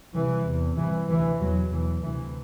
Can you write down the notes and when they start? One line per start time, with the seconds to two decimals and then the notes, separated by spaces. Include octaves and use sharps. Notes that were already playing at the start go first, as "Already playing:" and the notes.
0.14 C2 C3 E3
0.46 E2 C3
0.77 C2 C3 E3
1.08 D2 C3 E3
1.40 E2 B2 F#3
1.71 E2 B2 E3
2.02 D2 C3 E3